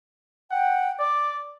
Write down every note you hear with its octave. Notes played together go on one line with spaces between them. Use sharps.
F#5 G5
D5 D6